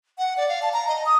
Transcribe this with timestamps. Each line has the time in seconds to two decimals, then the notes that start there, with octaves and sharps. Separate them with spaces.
0.18 F#5
0.37 D5
0.49 F5
0.62 A5
0.73 A#5
0.88 D#5
1.06 D#6